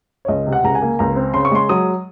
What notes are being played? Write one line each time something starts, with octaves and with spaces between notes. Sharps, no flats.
C#5
C#2 D#5
C3
F#5
C#2 A#5
G#5
A#3
C#2 A#5
C4
C#3 C6
C#6
G#3 C6
F#3 D#6